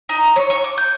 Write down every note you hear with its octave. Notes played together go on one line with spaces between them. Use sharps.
D#4
C#5
C#6
D6
G6